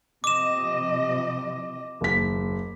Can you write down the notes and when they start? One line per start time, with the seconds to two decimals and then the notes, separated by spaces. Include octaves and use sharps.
0.24 C3 F3 D#5 D6 E7
2.01 F#1 D#2 B6